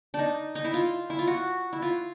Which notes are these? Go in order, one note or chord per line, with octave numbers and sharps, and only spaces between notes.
D4 D#4
D#4
E4
F4
E4
F4
F#4
E4
F4